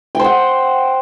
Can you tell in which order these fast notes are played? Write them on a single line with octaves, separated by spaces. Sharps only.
G5 C5 F#5